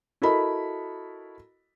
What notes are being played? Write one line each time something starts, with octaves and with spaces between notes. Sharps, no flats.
E4 F#4 A4 A#4 D#5 B5